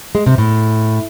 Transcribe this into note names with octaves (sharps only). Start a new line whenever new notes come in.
G#3
C3
A2